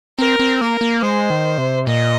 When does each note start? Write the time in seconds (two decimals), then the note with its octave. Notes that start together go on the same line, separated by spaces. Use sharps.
0.18 C4 A#4
0.40 C4
0.61 A#3 A#4
0.81 A#3
1.03 G#3 C5
1.30 D#3
1.58 C3
1.87 A#2 D#5